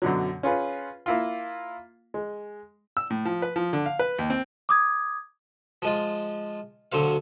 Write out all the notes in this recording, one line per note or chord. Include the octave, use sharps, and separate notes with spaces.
F#2 B2 D3 F#3
C#4 F4 G#4 B4
A#3 E4 F4
G#3
E6
A2
F3
B4
F3
D3
F5
B4
D#2
C4
D6 D#6 G#6
F3 G#3 F4
D2 D3 F#3 C5 F5